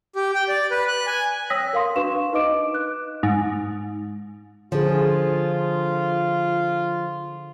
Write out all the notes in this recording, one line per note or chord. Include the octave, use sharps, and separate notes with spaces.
G4
G5
D5
B4
F#6
G#5
C#5 G5 D#6 E6 A#6 B6
A#4 F5 C6
D4 F#4 B4 F5 C#6 E7
D#4 B4 D#5 D6 D7
F#6
G#2
D3 F3 F4 G#4